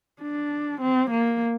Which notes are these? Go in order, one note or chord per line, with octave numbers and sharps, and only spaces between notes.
D4
C4
A#3